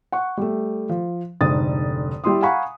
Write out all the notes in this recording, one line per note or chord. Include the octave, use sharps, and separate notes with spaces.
F#5 C#6
G3 A3
F3
F1 G#2 D3 D#6 A6
G3 E4 C6 D#6
F5 F#5 G#5 A#5 B5 C#6